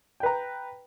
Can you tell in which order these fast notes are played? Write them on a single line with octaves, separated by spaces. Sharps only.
G5 B4 A#5